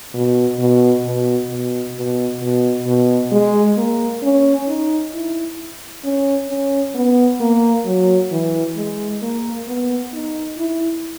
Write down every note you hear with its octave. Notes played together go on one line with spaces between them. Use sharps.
B2
B2
B2
B2
B2
B2
B2
G#3
A#3
C#4
D#4
E4
C#4
C#4
B3
A#3
F#3
E3
G#3
A#3
B3
D#4
E4